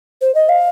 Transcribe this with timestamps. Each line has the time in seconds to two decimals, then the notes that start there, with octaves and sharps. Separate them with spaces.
0.21 C5
0.35 D#5
0.49 F5